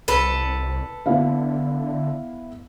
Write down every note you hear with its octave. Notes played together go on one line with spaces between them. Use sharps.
C2 A4 B4
D3 B3 E4 F5